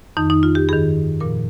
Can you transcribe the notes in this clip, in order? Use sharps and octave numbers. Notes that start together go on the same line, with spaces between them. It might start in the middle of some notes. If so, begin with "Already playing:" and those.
F2 D#3 D#4
D#4
F4
G4
G2 D#3 G#4
A#2 F3 A#4